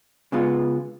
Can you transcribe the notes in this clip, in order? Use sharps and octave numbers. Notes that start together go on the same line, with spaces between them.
C#3 G#3 B3 F4